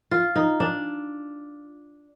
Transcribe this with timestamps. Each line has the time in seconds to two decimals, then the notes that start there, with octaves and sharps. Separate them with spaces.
0.11 F4
0.36 D#4
0.60 D4